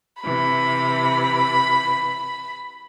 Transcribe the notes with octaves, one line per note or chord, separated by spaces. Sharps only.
C3 E3 B5